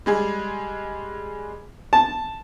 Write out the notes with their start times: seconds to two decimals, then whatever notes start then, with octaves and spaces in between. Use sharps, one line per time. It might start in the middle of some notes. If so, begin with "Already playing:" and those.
0.06 G3 G#3 G#4
1.93 A5